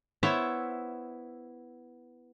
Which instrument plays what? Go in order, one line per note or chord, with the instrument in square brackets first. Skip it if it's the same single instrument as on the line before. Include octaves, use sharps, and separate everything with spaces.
[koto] B3 E4 C5 C#5 E5